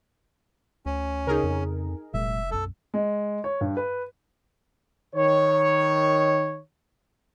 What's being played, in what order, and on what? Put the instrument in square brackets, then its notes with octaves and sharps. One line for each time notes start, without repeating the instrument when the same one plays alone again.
[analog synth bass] D2 [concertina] C#4
[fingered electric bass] C#3 [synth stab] D#4 G#4 A#4
[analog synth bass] F2
[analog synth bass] F1 [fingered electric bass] A#2 F#3 G#3 [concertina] E5
[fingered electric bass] B1 F#2 [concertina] A4
[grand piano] G#3
C#5
G2
B4
[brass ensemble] D#3 C#5